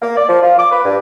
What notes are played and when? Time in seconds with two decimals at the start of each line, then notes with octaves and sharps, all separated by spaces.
0.02 A#3
0.17 D5
0.29 F3
0.43 F4
0.59 D6
0.71 B4
0.85 G2